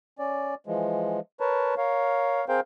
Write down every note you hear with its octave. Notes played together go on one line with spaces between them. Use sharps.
C#4 D5
E3 F3 G#3
A#4 B4 C#5 A5
A#4 C#5 F5
C4 G#4 A#4 C5 F5 G5